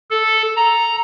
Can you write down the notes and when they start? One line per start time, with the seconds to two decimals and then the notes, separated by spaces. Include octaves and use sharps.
0.10 A4
0.56 A#5